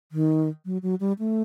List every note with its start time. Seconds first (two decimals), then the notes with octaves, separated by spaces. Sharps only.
0.12 D#3
0.65 F#3
0.82 F#3
1.00 G3
1.19 A3